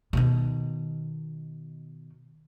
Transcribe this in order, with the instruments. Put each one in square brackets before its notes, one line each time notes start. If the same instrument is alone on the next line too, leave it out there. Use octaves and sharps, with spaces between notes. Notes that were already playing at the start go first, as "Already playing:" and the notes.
[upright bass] B2 D#3